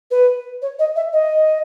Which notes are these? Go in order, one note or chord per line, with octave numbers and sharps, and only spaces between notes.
B4
C#5
D#5
E5
D#5